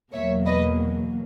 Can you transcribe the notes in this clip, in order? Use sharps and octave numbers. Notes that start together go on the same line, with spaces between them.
E2 B2 F#3 A#3 C#5 E5
B4 D#5